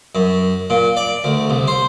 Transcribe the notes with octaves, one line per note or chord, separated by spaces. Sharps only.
F#2
A#2
D5
D2
C2
C5